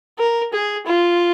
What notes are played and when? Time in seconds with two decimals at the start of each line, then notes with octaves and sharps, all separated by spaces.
0.19 A#4
0.53 G#4
0.86 F4